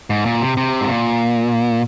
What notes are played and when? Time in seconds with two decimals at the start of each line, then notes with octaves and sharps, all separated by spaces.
0.10 G#2
0.25 A#2
0.41 C3
0.57 C3
0.81 G#2
0.88 A#2